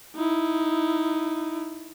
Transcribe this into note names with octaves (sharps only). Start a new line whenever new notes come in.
D#4 E4